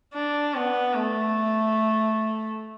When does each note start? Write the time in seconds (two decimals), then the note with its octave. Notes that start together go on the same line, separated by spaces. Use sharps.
0.14 D4
0.55 B3
0.95 A3